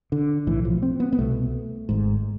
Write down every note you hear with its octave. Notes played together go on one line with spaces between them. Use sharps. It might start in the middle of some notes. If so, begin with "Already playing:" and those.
D3
B1 A2 E3
F3
C4
B3
B3
C2 B2 A3
G#1 G#2